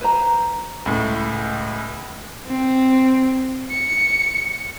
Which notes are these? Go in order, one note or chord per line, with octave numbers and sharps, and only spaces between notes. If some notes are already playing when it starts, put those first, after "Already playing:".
B4 C5 A#5
C#2 A2
C4
C#7